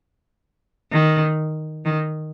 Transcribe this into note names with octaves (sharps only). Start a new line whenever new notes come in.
D#3
D#3